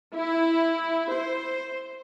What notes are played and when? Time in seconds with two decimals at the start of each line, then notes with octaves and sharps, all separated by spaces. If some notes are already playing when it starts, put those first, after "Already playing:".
0.14 E4
1.10 C5